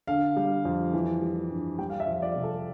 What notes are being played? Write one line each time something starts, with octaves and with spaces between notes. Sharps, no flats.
D3 F5
G3
F2
E3
G3
G2
G3 G5
F5
E5
F2
D5
C3
A4